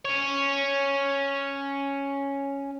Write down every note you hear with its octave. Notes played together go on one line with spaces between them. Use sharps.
C#4 C#5